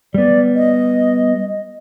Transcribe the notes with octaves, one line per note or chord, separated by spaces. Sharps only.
G3 B3 D5
D#5